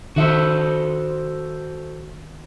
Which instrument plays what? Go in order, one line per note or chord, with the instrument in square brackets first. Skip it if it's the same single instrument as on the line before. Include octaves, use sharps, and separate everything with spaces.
[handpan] D#3 E5 [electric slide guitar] F#4 A4 C5